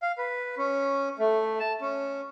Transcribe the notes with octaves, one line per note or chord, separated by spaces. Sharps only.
F5
B4
C#4
A3
A5
C#4